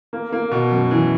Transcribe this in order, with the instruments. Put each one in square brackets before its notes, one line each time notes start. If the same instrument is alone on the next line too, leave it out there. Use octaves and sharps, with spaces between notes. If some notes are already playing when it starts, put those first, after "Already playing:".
[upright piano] A#3
A#3
B2
F#2
E3